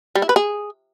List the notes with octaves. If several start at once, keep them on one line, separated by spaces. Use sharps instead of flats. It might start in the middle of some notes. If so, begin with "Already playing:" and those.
G3
E4
B4
G#4